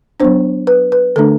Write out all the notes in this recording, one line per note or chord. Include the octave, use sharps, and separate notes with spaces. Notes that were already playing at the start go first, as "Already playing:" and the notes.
F#3 B3 D4 C5
B4
B4
D3 A3 D4 A4